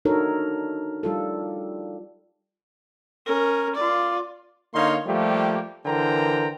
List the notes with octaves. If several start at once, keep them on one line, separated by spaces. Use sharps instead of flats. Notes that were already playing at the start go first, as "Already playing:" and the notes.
D4 D#4 F#4 A4 A#4 C#5
G3 F4 A4
C#4 A#4
F4 D5
D3 A#3 D#4 C#5 F5 C6
F3 G3 A3 A#3 G4
D3 E3 A#4 C5 G5 A#5